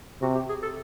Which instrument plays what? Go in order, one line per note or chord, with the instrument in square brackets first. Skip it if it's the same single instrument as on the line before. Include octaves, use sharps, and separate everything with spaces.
[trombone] C3 [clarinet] F#4
[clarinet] G4
G#4
A4